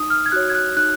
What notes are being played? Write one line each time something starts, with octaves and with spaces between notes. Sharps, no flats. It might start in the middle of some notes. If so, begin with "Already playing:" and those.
Already playing: D#4 D#6
F6
G#6
F#4 C#5 F#6
G#6
F#6
D#4 F#6